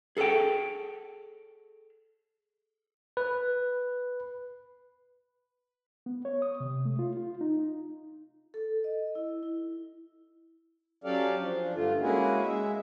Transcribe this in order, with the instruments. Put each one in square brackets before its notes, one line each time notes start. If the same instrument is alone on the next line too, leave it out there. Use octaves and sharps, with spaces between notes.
[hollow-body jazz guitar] G#4 A4 B4 C#5 G5
[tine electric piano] B4
[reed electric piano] B3
C#5
D#6
C3
A3
F4
F4
D#4
[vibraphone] A4
D#5
E4
E4
[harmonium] F#3 C#4 G4 A4 D5 F5
F3 D4
G2 D3 A3 F4
G#3 A#3 C#4 E4 F#4 G#4
G#3 E5